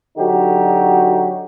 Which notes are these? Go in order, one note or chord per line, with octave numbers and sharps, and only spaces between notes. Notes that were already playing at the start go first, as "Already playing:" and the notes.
D3 F#3 D#4 F#4 G4